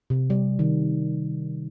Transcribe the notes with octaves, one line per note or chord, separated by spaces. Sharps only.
C3
G3
D#3